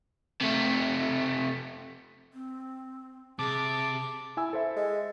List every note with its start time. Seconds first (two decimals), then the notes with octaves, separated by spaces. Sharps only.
0.41 C3 A3
2.34 C4
3.39 C3 G#4 A5 D6
4.37 E4 G#5 E6
4.53 A4 C5 E5
4.76 G#3